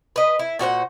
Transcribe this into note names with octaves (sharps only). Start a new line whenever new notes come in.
B4 D#5
E4
A#2 F#4 C5 F#5